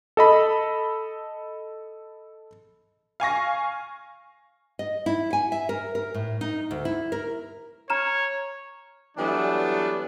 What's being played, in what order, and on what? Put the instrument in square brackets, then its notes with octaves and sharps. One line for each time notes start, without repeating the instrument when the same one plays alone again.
[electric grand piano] A4 D#5 B5
[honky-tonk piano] F5 G#5 C#6 A#6
[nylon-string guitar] D#5
E4
G#5
E5
A#4
A#4
A2
D#4
D2
E4
A#4
[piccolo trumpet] C#5 [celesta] A#5 F6 E7
[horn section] E3 F#3 G3 A3 B3 D4